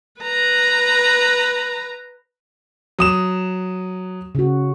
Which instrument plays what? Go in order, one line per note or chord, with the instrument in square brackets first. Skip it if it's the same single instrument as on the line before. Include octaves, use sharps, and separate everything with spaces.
[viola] B4 A#5
[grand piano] F#3 D#6 E7
[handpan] C#3 F#4